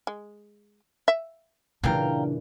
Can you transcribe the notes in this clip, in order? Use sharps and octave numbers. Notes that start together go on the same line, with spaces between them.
G#3
E5
G2 A#2 C#3 E3 D4 F5 G5 A#5